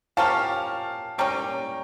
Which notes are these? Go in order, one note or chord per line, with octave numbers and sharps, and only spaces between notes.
F3 C#4 G4 A#4 F5 A5
G3 A#3 C#4 G5 A#5